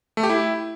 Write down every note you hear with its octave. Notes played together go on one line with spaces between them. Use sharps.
A3
G4
E4